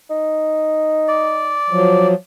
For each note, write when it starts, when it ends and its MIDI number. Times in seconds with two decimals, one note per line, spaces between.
0.10 1.58 63
1.08 2.08 74
1.70 2.14 53
1.70 2.14 54